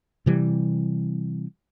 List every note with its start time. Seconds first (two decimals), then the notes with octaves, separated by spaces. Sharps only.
0.26 C3 E3 G3